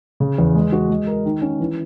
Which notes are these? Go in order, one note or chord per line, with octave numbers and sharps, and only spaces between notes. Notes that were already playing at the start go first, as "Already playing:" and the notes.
C#3
E2
G#3
F#4
G#3
A#4
D#3
C#4
E3